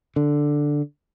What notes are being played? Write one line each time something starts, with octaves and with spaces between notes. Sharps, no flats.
D3